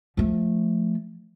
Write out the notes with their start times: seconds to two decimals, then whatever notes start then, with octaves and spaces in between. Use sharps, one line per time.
0.17 F3 A3